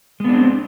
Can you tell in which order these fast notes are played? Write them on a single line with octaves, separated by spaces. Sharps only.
G#3 B3 D4 C4